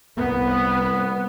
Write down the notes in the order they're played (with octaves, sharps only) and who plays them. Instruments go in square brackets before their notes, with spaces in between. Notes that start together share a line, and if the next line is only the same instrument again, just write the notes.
[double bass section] C2 B3